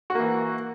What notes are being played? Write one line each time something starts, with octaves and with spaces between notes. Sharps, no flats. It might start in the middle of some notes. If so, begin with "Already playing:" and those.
E3 A#3 F#4